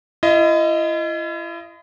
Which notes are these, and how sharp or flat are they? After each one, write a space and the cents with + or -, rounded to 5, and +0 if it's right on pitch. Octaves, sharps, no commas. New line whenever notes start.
E4 +40 D#5 +5